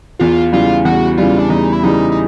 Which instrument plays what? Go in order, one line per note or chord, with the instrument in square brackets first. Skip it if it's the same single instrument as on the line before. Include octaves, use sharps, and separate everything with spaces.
[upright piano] E2 [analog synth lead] F4
[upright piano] C#3 E3 G3 [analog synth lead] F4
[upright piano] E2 [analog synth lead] F#4
[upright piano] C#3 E3 G3 [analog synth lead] F4
[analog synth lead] D4
[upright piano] E2 [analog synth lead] D#4
[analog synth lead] E4
[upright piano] C#3 E3 G3 [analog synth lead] D#4
[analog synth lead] D#4